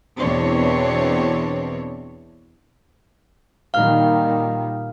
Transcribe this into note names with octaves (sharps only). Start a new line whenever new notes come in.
E2 B2 E3 C4 D4 C#5
A#2 D#3 G3 F5 F6